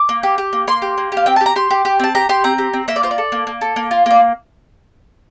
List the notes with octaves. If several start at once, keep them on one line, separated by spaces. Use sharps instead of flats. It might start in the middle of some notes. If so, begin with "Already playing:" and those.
Already playing: D6
A#3
G4
G4
A#3
A#3 C6
G4
A#3
G4 F5
C4 G5
A5
G4
A#5
G4 C6
G4
G4
C4 A5
G4 A#5
G4 C6
C4 A#5
G4
C4
A#3 E5
D5
F4 C5
D5
A4
A#3
A#3
A4
A#3
F4
A#3 D5